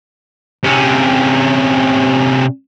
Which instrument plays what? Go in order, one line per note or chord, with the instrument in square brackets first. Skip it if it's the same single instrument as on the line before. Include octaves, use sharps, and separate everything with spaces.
[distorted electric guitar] C3 C#4